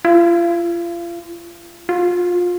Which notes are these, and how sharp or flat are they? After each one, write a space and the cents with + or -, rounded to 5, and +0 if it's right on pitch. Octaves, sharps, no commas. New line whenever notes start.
F4 -35
F4 +25